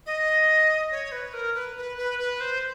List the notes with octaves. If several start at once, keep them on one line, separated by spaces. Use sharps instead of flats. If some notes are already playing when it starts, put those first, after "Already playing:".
D#5
C#5
B4
A#4
B4
B4
B4
B4
C5